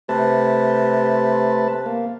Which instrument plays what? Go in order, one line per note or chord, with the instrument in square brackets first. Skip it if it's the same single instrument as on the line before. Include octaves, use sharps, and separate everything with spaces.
[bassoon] C3 [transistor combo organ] A3 B4 A5
[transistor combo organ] A#3